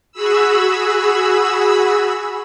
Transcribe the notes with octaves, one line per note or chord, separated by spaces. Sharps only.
F#4 G#4 B5 E6